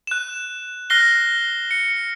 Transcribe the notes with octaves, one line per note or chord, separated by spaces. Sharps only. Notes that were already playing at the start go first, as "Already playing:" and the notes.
F#6 E7
F6 F#6 A#6 C7 G7
C#7